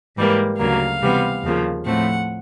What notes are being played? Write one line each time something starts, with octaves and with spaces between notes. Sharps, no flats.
G#2 E3 G3 A#3
D2 C#3 F#3 A#3 F5
C3 E3 G3 B3
D#2 C#3 F3 A#3
A2 F3 A3 C4 F#5